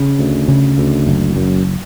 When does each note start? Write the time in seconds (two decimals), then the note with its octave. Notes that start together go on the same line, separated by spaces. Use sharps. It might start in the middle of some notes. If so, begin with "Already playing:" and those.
Already playing: C#3
0.19 D2
0.48 C#3
0.78 D2
1.07 F#1
1.36 F#2